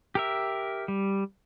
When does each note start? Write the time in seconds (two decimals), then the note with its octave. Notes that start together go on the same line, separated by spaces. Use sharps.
0.15 G4 A#4 E5
0.88 G3